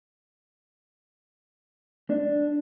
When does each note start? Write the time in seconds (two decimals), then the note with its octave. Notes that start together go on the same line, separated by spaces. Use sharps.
2.10 D4